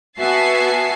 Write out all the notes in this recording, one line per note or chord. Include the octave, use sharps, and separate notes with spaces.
B3 F#4 E5 G#5 A5 C7